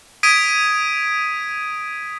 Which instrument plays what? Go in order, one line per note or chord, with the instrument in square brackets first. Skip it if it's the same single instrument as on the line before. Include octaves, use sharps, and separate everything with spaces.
[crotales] D#6 G#6 B6 D7 D#7